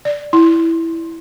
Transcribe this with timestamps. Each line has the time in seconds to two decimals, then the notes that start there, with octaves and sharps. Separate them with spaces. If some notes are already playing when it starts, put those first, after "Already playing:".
0.05 D5
0.33 E4